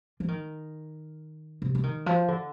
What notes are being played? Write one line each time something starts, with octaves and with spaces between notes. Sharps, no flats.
F3
D#3
C3
F3
D#3
F3
D3